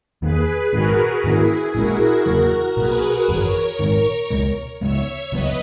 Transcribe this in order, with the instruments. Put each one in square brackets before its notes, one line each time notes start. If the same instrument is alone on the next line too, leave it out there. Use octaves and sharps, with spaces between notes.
[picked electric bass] E2 D#3 A#3 [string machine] G#4 B4
[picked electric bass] A#1 G#2 D#3 [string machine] F#4 A#4
[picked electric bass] G#2 D#3 A#3 C#4 [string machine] E4 G#4
[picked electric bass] A#1 A#2 G#3 C#4 [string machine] F#4 A#4
[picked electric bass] E2 C#3 F#3 A#3 [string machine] F#4 A#4
[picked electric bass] B1 B2 A#3 [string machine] G#4 B4
[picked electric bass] G#1 F#2 E3 [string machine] A#4 C#5
[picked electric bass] A#1 G#2 D#3 [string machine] A#4 C#5
[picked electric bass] C#2 B2 G#3
[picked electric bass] C#2 C#3 G#3 B3 [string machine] C#5 E5
[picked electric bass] C#2 C#3 F#3 B3 [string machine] B4 D#5